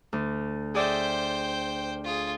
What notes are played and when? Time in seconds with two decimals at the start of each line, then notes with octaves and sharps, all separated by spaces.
0.13 D2
0.75 G#4 C5 D5 E5 G5
2.04 F4 G#4